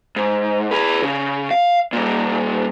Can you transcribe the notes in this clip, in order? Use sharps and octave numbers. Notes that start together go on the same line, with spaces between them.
G#2
G#4 B4
C#3
F5
A#2 G3